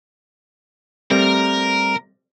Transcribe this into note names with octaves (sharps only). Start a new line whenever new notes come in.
G3 A3 C4 A#4